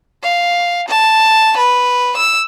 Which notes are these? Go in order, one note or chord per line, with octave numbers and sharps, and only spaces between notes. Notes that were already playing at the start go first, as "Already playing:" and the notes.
F5
A5
B4
E6